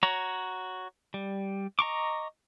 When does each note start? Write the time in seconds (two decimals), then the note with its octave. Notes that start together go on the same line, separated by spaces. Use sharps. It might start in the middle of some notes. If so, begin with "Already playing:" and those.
0.03 F#4 C#5 A#5
1.14 G3
1.79 D#5 A#5 C#6 D6